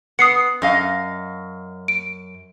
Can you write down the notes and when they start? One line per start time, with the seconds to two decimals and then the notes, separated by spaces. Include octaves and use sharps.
0.19 B3 D#6 C7 C#7
0.62 F#2 D#5 F5
1.88 D7